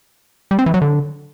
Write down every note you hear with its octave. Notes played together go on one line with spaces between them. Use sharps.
G3
C4
E3
F#3
D3